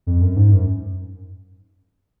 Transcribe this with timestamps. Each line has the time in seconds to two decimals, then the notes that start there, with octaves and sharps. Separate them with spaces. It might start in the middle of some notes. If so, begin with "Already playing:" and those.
0.07 F2
0.21 F#2
0.36 G#2
0.52 F#2